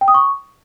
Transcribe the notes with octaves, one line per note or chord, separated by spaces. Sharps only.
G5
D#6
C#6